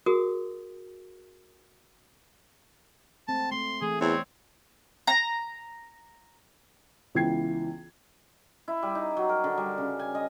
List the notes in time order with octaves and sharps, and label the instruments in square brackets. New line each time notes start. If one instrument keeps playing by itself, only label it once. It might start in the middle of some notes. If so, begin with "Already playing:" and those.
[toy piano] F#4 G#4 A#4 D#6
[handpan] G#3 A3 C4 [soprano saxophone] A5
[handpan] A3 C4 [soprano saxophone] C6
[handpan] E3 A3 [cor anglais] G#4
[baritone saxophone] E2 [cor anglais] C4 [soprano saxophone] C#5 [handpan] D5
[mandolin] A#5
[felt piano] C#2 E3 B3 G5 G#6 C7
[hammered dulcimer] E4
G3
D#4
F#3
A#4
D3
G3
C#3
G#5
D#5